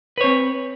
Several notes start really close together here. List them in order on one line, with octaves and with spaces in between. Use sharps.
B4 C#5 C4